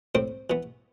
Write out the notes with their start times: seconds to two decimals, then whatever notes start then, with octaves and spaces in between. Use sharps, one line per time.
0.15 A2 C4 C5
0.50 E3 B3